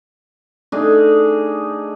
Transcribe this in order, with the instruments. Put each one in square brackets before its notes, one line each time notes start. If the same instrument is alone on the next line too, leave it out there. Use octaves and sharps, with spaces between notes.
[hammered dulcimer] A3 D4 D#4 G#4